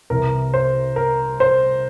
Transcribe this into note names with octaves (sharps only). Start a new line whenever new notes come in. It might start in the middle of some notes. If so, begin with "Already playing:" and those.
C2 C3 E3 A#4
C5
A#4
C5